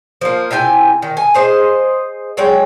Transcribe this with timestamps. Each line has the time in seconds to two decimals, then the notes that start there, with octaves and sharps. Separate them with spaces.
0.21 F3 A#3
0.51 C3 E4 G4 G#5
1.02 D#3
1.17 G#5
1.34 G#4 C5 D#5
2.37 F#3 G#3 C#5 G5